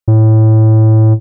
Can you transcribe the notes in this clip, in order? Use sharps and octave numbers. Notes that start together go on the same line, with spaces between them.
A2